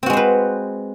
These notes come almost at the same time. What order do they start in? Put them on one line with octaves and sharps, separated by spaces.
C4 F#4 G#3 C5 B4